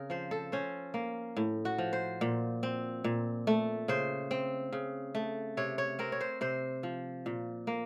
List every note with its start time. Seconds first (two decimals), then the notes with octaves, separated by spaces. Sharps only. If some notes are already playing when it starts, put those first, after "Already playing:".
Already playing: C#3 C4 A#4
0.10 F3 C5
0.31 A4
0.52 C#4 C5
0.94 A#3
1.37 A2
1.65 F#4
1.78 F3
1.93 C5
2.21 A#2
2.63 C4
3.04 A#2
3.47 A3
3.88 C#3 C5
4.31 C4
4.72 C#3
5.15 A3
5.57 C3 C#5
5.78 C#5
5.99 C4 A#4
6.12 C#5
6.21 C5
6.41 C3 C5
6.83 F3
7.26 A#2
7.67 A#3